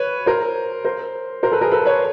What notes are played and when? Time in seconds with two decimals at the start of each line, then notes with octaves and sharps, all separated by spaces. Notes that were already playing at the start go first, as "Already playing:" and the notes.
Already playing: B4 C#5
0.26 A#4 C5
0.85 A#4 C5
1.43 A#4 C5
1.52 A4 B4
1.61 G#4 A#4
1.72 A4 B4
1.85 B4 C#5